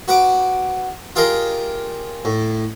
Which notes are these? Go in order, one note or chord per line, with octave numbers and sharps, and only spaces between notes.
F#4 B4 F#5 D6
F4 G4 G#4 A#4 D#5
A2